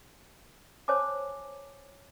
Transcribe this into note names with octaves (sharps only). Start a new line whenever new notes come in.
C5 C#5 G#5 A5 D6